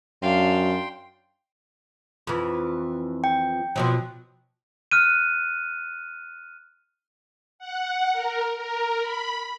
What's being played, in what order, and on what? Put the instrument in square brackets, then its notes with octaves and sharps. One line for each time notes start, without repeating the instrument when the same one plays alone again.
[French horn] F#2 [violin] D4 F5 [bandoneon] G5 C6
[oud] F2 E3
[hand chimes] G5
[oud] B2 F3 F#3
[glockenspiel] F6 F#6 D#7
[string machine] F#5
A#4
A#4
B5